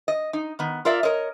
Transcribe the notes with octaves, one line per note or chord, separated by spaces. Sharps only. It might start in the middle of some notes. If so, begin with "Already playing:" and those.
D#5
D#4
D#3 B3
F4 A#4 D5 E5
A#4 C#5 D#5